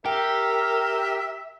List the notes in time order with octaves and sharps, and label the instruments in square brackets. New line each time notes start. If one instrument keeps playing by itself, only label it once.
[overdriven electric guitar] G4 [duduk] A#4 [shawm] E5 [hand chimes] G5